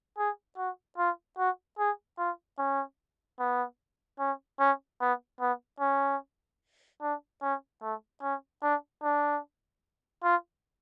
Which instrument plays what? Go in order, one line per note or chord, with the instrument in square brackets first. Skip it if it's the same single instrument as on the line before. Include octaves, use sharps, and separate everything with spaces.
[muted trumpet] G#4
F#4
F4
F#4
G#4
F4
C#4
B3
C#4
C#4
B3
B3
C#4
D4
C#4
A3
C#4
D4
D4
F4